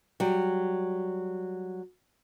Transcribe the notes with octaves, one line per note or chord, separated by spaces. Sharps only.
F#3 G3